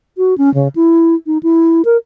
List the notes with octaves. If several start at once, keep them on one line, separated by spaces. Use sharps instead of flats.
F#4
C#4
C#3
E4
D#4
E4
A#4